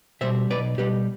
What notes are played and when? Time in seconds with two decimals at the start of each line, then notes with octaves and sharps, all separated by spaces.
0.21 B2 G3 C5 E5
0.50 B1 B4 D5
0.78 B2 G3 G4 B4